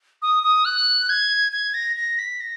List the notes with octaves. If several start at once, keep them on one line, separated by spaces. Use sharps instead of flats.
D#6
D#6
F#6
G#6
G#6
A#6
A#6
B6
A#6